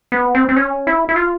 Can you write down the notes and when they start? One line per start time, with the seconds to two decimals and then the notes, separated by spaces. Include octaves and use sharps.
0.12 B3
0.35 C4
0.49 C4
0.56 C#4
0.87 E4
1.09 E4
1.16 F4